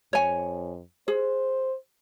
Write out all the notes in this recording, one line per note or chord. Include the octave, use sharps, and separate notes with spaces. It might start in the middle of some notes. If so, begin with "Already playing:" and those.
F2 C#5 G#5
G#4 C5